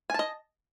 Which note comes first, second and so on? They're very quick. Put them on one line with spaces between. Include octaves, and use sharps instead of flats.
G#5 A5 D#5